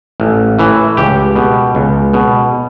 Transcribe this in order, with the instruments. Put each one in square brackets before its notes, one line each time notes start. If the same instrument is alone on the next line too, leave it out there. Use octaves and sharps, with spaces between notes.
[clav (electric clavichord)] A1
A2 E3
C#2 G4
B2
C#2
B2